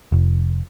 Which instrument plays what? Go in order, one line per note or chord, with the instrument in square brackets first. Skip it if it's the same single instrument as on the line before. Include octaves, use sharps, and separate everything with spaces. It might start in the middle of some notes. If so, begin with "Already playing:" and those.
[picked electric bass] F1